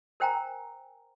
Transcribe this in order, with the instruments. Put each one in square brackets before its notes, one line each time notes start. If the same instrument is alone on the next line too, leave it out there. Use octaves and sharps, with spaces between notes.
[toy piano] A#4 C5 G5 G#5 A#5